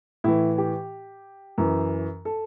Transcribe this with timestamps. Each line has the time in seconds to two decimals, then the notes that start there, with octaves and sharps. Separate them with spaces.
0.24 A2 E3 E4
0.58 G4
1.58 F#2 E3
2.25 A4